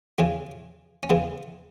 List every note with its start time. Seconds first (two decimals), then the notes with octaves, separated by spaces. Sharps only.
0.18 E2 C#3 E3 C#4
1.03 C#4
1.10 E2 C#3 E3 B3